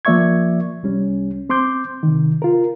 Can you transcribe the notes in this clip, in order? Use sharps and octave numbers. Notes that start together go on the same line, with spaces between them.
F3 A#3 D5 E5 C#6 G#6
C2 G3 C#4
C4 C6 D6 G6
C3 D#3
F4 A#4